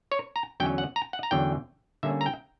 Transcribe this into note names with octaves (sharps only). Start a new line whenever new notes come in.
C#5
A#5
E2 D3 F#3 C#4 G5
F#5
A#5
F#5
A#5
E2 D3 F#3 C#4 G5
D3 G3 A#3 C#4 E5
A#5
G5